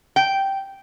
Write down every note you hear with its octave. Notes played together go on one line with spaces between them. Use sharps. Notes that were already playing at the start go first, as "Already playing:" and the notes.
G5